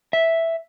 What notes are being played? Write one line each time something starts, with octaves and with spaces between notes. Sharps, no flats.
E5